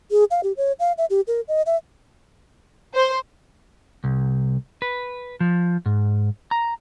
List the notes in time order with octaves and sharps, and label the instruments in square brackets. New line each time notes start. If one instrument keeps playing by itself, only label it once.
[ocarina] G#4
F5
G4
C#5
F5
E5
G4
A#4
D#5
E5
[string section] C5
[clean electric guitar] C2
B4
F3
G#2
A#5